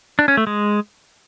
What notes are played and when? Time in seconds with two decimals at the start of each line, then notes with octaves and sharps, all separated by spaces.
0.19 D4
0.28 C#4
0.37 A3
0.47 G#3